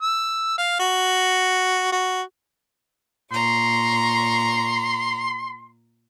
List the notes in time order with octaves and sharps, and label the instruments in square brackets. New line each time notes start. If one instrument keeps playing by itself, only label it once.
[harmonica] E6
F5
F#4
F#4
[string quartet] A#2 A#5 C#6 [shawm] C6